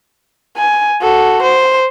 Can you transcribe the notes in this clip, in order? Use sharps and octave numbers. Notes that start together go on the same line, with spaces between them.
G#5
F#4 A4
C5